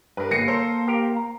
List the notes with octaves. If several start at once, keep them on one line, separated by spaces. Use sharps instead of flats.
G2 A#4 B4
G1 A#3 G#5 A#6 C7 C#7
A4 A#4 C5
G4 A#4
A#5